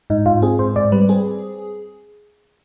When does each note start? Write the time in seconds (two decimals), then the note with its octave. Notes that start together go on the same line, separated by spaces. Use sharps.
0.10 G#2 D#4
0.26 G#2 F4
0.42 C4 G#4
0.59 G#2 C5
0.76 G#2 D5
0.92 G3 B4
1.09 C4 G#4